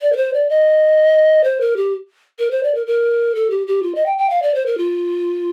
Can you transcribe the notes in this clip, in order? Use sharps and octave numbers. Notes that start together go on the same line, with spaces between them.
D5
A#4
C5
D5
D#5
C5
A#4
G4
A#4
C5
D5
A#4
A#4
A4
G4
G4
F4
D#5
G5
G5
F5
D5
C5
A#4
F4